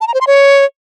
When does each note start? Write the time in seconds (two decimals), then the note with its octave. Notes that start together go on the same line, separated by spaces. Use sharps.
0.01 A5
0.08 A#5
0.14 C5
0.21 C6
0.27 C#5